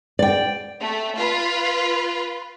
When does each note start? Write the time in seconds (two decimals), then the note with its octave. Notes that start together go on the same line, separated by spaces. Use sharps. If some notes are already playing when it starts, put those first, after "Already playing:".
0.19 D5 G5
0.79 A3
1.16 F4 B4